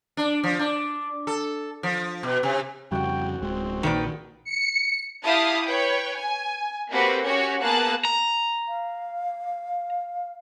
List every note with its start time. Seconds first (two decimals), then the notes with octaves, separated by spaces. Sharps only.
0.17 D4
0.43 F3
0.59 D4
1.27 A4
1.83 F3
2.23 B2
2.43 C3
2.92 F2 C#3 G3 F#4 F#5 G5
3.41 D1 G#3 C4
3.83 A#1 A#2 D#3 B4 D5
4.44 C#7
5.24 E4 G4 F5 A5 D#6
5.67 B4 C#5 G5
6.17 G#5
6.91 A#3 C4 F#4 G4 A4 B4
7.25 C#4 F#4 G4 C#5
7.63 A#3 B3 G#4 A5 F#6
8.05 A#5
8.68 F5